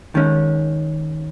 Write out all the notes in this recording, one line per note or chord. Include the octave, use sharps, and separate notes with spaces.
D#3 G#3 C#4